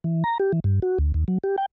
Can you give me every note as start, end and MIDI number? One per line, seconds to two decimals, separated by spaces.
0.04 0.24 52
0.24 0.38 82
0.40 0.52 67
0.52 0.60 52
0.64 0.80 43
0.82 0.98 66
0.98 1.12 38
1.14 1.24 39
1.28 1.38 54
1.44 1.56 67
1.58 1.66 79